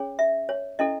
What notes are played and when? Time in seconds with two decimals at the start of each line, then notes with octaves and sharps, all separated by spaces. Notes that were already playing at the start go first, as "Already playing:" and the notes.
Already playing: C#4 G#4 C#5
0.19 E5
0.49 C#5
0.79 C#4 E4 A4 D#5